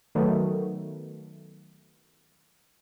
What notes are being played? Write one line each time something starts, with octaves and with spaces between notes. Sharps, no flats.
D#3 F#3 A3 B3